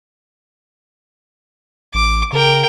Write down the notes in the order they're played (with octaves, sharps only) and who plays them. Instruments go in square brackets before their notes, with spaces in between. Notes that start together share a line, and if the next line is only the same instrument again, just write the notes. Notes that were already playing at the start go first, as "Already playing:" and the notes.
[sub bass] A1 [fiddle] D6
[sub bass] C#3 [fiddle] A#4 G5